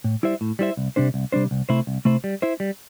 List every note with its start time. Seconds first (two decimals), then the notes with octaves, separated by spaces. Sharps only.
0.04 A2
0.23 G3 E4 C5 E5
0.41 A2
0.59 G3 E4 C5 E5
0.77 C2
0.96 C3 G3 D4 C5
1.14 C2
1.32 C3 G3 D4 C5
1.51 C2
1.69 C3 A3 E4 C5
1.87 C2
2.05 C3 A3 E4 C5
2.24 G3
2.42 E4 C5 E5
2.60 G3